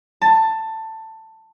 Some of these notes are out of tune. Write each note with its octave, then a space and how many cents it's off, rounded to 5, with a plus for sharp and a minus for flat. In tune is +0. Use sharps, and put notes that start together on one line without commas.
A5 +15